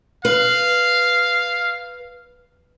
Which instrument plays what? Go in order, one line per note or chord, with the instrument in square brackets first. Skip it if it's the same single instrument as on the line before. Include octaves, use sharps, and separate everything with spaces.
[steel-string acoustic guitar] B4 [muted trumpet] F5